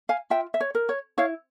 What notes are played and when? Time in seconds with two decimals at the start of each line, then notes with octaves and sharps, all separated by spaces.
0.09 F5 G#5
0.30 F4 E5 G5
0.54 E5
0.61 C#5
0.75 A#4
0.89 C#5
1.18 E4 C#5 F5